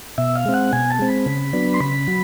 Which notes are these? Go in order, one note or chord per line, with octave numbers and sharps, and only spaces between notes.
B2 E5
F5
G#3 C4
F#5
B2 G#5
A5
G#3 C4
B5
C#3
F#3 B3 D4
C6
C#3 B5
F#3